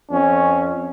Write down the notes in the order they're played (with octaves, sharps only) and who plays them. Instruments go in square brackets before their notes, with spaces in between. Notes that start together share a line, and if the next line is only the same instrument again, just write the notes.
[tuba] F2 [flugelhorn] C#4